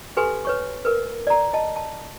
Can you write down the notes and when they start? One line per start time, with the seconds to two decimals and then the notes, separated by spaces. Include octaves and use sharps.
0.17 G4 A4 B4 G#5 C6
0.45 B4 C#5 C#6
0.85 A#4 B4
1.27 D5 A#5
1.53 D#5 A5
1.76 A5